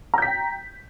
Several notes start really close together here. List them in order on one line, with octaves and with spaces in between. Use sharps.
A#5 G6 B6 G5